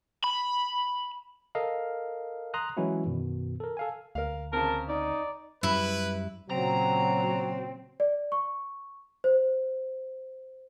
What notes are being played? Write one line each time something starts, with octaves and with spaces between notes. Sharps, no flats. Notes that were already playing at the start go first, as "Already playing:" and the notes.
B5
A4 A#4 D#5 F5
A#5 C6 D#6 F#6
E3 F#3 G#3 C#4 E4 F#4
F#2 B2 D#3
A4 A#4
A4 F5 G#5
D2 A#4 F5
C#3 C4 A#4 A5
D#4 D5
F#2 G3 E4 B4
A#2 C#3 F#3 C4 A#5
D5
C#6
C5